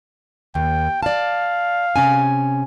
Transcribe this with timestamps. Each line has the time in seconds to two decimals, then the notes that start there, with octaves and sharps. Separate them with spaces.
0.55 D#2 G5
1.03 D5 F5 A5
1.96 C3 C#4 G#5